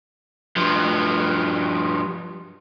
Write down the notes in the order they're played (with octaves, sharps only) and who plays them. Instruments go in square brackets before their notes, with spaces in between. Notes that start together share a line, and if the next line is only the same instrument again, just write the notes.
[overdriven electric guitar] G2 F3